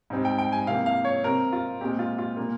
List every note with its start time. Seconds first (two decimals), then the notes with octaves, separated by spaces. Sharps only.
0.10 G#2 G3 C4
0.25 G5
0.38 G5
0.52 G#5
0.67 C3 E3 A#3 F5
0.86 F5
1.05 C#5
1.24 C3 G3 C4 A#4
1.53 F4
1.81 A#2 G#3 C4 G4
1.99 F4
2.18 F4
2.37 A#2 G3 A#3